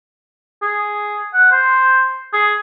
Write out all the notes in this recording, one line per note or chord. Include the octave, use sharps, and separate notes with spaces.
G#4
F#5
C5
G#4